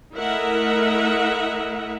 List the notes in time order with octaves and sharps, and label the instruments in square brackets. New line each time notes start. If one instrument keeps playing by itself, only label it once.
[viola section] A3 E4 A#4 D#5 E5 F#5